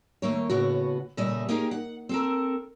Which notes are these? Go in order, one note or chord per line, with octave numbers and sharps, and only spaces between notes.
D#2 A3 A#3 C#5
A2 C#3 B3 F#4
A#2 C#3 G3 A3 D#5 E5
A#3 C#4 D#4 G4 G#4 A#4
F#5
C4 A4 A#4